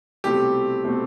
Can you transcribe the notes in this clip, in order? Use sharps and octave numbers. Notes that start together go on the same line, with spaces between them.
C2 B2 A3 C4 E4 G4
B2 A3 C4 E4